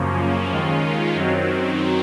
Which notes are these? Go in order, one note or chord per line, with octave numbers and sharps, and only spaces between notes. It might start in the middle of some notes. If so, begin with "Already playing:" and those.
Already playing: F#2 C#3 F3 A#3 C#4
D#2 D#3 G#3 C#4 F4
F#2 D#3 F#3 C4